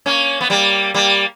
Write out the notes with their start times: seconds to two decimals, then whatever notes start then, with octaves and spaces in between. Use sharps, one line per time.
0.06 A#3 C#4
0.41 B3
0.50 G3 A#3
0.94 G3 A#3